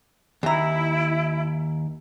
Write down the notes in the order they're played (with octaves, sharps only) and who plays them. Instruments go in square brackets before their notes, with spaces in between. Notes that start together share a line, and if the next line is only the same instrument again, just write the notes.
[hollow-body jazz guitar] D#2 A#5 [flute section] E4